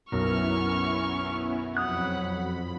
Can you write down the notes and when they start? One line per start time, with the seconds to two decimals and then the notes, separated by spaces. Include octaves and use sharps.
0.12 B1 F#2 B3 C#4 E4 A#4 C#6 F6
1.77 F2 F#3 F#5 B5 D#6 F#6